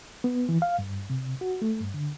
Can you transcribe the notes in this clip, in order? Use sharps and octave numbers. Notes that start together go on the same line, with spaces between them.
B3
E3
F5
G2
C3
F#4
A3
G2
D3